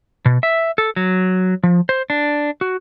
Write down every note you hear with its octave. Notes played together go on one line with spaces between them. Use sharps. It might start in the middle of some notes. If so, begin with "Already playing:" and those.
B2
E5
A4
F#3
F3
C5
D4
F#4